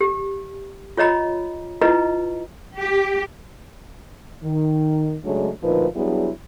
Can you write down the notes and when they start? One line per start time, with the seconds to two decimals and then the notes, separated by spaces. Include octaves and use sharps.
0.01 G4
0.97 F4 C#5 D#5 A#5 B5
1.82 E4 F4 B4 D#5 A#5
2.78 G4
4.43 D#3
5.24 C#3 F#3 G#3 A3 D4
5.63 D2 A#2 F3 D#4 A#4 B4
5.94 F#3 G3 B3 D4 E4 G#4